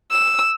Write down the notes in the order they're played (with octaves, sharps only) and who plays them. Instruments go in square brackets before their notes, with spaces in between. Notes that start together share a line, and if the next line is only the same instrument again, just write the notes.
[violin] E6